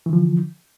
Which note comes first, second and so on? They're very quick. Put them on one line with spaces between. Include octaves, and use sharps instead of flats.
E3 D3 F3